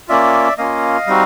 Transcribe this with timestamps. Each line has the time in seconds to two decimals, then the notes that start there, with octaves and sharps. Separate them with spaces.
0.08 A#3 C#4 F4 D5 E5
0.58 A#3 C#4 F4 D#5 F5
1.07 G3 C4 D#4 F#4